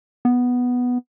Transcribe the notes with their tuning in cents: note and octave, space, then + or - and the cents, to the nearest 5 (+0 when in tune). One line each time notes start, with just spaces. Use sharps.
B3 +0